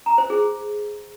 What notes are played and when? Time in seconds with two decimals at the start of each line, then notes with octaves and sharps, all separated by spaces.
0.06 A#5
0.18 C5
0.30 G#4